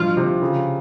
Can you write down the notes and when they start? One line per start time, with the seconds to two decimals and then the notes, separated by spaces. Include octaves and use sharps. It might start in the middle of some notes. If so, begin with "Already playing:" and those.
Already playing: F3 F4
0.17 C3
0.42 C#3